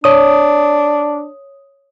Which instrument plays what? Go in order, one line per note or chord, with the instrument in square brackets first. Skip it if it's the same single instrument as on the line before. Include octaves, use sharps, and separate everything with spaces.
[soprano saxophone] D4 [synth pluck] C#5 D#6